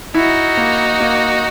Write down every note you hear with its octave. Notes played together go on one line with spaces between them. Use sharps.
D#4 E4 F#4
A#3
A#3